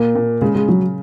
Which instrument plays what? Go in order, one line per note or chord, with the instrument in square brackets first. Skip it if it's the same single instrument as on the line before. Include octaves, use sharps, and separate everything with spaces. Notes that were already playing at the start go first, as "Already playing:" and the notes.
Already playing: [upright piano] A#2 [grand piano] A#3
[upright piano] A#2
[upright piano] C#3 [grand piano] G#3
[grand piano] G#3
[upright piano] C#3 [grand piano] F#3